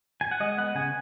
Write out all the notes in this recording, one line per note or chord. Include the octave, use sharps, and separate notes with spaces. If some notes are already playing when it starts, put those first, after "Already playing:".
G#5
F#5
G#3 D#5
B3 F#5
C#3 G#5